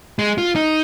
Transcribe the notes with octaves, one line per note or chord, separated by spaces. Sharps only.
G#3
F4
D#4